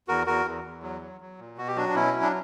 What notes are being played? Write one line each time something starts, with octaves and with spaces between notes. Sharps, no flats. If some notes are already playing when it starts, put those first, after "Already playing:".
E2 F#4 A#4
E2 F#4 A#4
E2
E2
F#3
F#3
F#3
A#2
B2 F#4
G4
F#3 D4 F#4
D4
B2 C#4 E4
F#3
D4